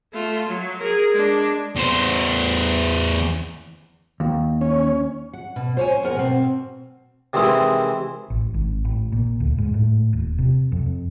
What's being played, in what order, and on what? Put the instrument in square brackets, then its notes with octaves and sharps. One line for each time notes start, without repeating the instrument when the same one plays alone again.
[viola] A3 F4
F#3
G#4 A#4
G#3 D4
[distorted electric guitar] E2 C5
[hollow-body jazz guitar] D#2
[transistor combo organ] C#4
[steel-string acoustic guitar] F#5
B2
C5 C#5 F5 G#5
D#2 B3 A#4 F#5
B2 C4
[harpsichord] C3 D#3 E3 G#3 C4 E4
[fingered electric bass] A1
G#1
A1
A#2
D2
G#2
A2
D#1
C3
F2